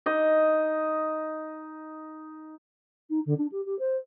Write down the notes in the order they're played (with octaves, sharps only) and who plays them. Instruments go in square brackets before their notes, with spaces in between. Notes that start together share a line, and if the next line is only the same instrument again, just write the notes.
[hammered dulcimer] D#4 D#5
[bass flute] D#4
D3
D4
G4
G4
C5